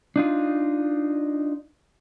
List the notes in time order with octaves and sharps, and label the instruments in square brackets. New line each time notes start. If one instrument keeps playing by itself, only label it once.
[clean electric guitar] D4 D#4 F4